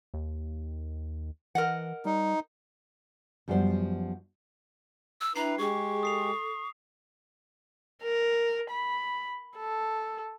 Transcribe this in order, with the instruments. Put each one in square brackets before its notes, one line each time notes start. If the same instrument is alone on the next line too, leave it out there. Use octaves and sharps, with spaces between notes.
[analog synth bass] D#2
[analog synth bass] E3 [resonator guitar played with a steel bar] A#4 D#5 F#5
[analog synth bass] G3 [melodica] D#4
[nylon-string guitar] F#2 F3 G3 B3 A4 C5
[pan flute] E6
[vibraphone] D4 G5 [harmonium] E4 B4 [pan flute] A#5 [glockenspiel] C7
[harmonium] G#3 G4 [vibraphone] G#4 [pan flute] C#6
[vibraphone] A4 [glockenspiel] D#6 C7 F7
[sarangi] A#4
B5
A4